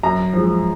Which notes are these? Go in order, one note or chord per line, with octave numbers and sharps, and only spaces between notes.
F#2 A#5
F3 G#3